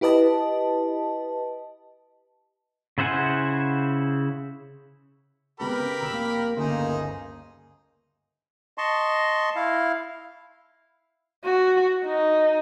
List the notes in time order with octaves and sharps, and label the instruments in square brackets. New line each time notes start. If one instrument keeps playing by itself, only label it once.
[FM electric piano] E4 G4 B4 D#5 A5
[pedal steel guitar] C#3 E4 C5 F#5 G#5
[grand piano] C3 G#3 B3 [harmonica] G4 A#4 B5 [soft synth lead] B4
[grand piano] C#3
[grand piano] F1 A#5 [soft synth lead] E6
[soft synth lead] A#3
[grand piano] G1 D2 C#3 [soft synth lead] A#3 [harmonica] D#4 G#4 C5
[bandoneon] D#5 A5 C6 C#6
E4 F5
[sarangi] F#4
D#4